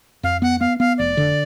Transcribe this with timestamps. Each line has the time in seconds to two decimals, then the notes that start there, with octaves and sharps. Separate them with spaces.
0.23 F2 F5
0.42 B3 F#5
0.60 B3 F5
0.80 B3 F5
0.98 F1 D5
1.17 D3